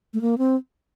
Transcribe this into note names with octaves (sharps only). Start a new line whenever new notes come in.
A3
A#3
C4